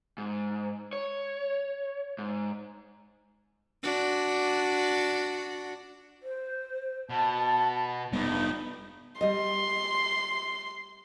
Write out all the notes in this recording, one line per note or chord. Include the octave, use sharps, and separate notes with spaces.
G#2
C#5
G#2
D4 F#4
C5
B2 A5
F1 G2 G3 B3 D#4
G3 D#5 C6